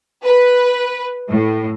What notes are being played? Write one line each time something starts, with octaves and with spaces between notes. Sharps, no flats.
B4
A2